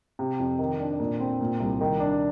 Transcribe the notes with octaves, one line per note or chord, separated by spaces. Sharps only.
C3
F2
D#3
D4
A#2
C4
A#2
C2
D#3
D4